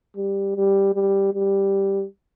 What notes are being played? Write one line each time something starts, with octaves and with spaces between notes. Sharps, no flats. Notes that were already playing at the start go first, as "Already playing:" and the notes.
G3
G3
G3
G3